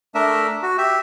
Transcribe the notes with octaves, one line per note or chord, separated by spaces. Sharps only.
A3 D4 A#4 E5
F#4
G4 E5